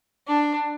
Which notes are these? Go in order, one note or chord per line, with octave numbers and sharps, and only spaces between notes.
D4